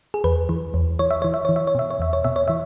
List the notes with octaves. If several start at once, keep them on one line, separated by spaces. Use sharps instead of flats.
G#4
E2 B4
E3
E2
E3 C#5
E5
E3 C#5
E5
E3 C#5
E5
C#5
B2 E5
C#5
E2 E5
C#5
B2 E5
C#5
E3 E5